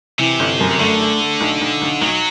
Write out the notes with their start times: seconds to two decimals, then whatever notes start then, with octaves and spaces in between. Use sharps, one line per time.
0.19 C3 E3
0.39 G1
0.60 F#2
0.80 D3 A3
1.01 A3
1.21 A3
1.41 B1
1.61 B1
1.82 B1
2.01 B1 F#3